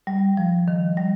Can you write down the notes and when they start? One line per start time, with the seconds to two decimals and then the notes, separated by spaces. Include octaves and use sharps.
0.07 G3
0.37 F3
0.68 D#3
0.97 G3